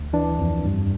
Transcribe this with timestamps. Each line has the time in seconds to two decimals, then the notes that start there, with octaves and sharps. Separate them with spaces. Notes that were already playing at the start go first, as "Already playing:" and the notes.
Already playing: D2
0.13 E3 D4
0.39 F2
0.65 G2